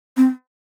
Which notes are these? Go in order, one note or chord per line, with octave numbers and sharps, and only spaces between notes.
C4